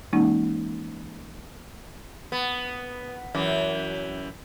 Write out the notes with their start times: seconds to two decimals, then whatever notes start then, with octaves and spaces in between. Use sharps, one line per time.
0.13 E3 G#3 A#3 C#4 D#4
2.32 B3
3.35 F#2 E3